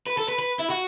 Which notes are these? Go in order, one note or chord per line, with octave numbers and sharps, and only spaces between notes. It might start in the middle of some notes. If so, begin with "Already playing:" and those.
B4
A4
B4
B4
E4
F#4